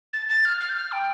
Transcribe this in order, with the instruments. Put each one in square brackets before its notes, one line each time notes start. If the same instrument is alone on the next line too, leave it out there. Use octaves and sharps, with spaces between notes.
[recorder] A6
A6
F6
F6
G6
F6
G5